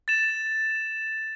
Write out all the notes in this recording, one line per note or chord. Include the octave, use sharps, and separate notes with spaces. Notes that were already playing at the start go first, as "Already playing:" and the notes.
A6 E7